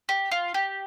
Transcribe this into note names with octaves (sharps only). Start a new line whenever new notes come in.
G4
F4
G4